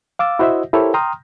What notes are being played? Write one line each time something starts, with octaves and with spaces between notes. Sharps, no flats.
F5 D6 E6 A6
E4 F#4 C5 D#5 E5
E4 G4 A4 A#4 C5 C#5
G5 A#5 C6 D#6 F6